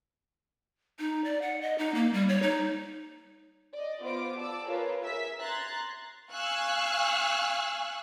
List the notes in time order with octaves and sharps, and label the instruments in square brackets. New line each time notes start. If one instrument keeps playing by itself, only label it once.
[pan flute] D#4
D5
F#5
D#5
D#4
A#3
G3
C#5
D#4
[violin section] D5 D#5
B3 F4 C5 D6 D7
D5 A5 D6 E6
F4 G#4 A#4 B4 C#5
G#4 A#4 E5 E6 B6
A#5 C6 F#6 G#6 A6
F5 G#5 C#6 E6 F#6